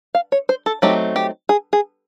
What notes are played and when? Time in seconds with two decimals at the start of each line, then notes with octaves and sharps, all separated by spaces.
0.15 F5
0.32 C#5
0.49 C5
0.66 A4
0.82 F#3 A3 C4 D#4 G4
1.16 G4
1.49 G#4
1.73 G#4